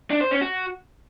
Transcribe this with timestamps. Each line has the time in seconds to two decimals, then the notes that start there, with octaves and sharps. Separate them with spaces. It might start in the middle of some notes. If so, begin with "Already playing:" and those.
0.11 D4
0.21 C5
0.31 C#4
0.41 F#4